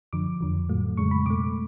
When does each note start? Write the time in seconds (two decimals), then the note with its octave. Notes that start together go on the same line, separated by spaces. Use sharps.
0.13 F#2 D3 F3 D6
0.41 F2 D3 F3
0.69 A2 F#3 A3
0.97 F2 C#3 G#3 C#6
1.11 B5
1.25 B2 A3 D6